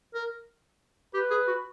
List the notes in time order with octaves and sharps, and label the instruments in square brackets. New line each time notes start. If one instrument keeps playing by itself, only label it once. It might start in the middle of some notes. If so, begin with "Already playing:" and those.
[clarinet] A#4
[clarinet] G4 [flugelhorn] B4
[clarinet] G#4
F#4